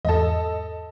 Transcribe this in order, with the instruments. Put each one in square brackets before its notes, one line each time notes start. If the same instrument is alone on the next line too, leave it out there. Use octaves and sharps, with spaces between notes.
[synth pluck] E2 G#2 A5 [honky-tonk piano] A4 D#5